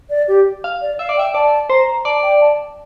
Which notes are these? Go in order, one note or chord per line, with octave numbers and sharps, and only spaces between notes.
D5
G4
F5
D5
E5 F5
D5
E5 G5
D5 A5
C5 A#5
D5 A5
G5
A5